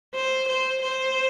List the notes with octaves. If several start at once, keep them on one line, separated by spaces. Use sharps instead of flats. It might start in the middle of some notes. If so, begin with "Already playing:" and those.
C5
C5
C5